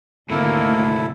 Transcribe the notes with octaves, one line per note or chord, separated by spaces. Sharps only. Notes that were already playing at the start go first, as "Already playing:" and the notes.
D2 G#2 C3 D#3 A#3 E4 A4